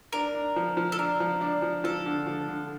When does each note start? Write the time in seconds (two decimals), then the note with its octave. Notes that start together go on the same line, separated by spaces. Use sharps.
0.12 D4 A#4
0.34 D4
0.56 F3
0.77 F3
0.92 A4
0.98 D4 A#4
1.20 F3
1.41 D4
1.62 F3
1.84 F3 A4
2.06 D3
2.26 F3
2.48 D3